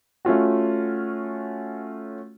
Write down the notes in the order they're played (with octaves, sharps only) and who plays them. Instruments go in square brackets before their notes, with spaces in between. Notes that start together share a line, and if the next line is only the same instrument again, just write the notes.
[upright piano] A3 C#4 F4 F#4